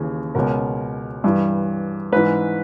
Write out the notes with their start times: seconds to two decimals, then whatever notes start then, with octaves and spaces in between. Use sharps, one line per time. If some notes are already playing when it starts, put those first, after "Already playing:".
Already playing: D#2 C#3 E3
0.35 C#2 B2 A#4
1.24 G2 E3
2.12 G#2 E3 B4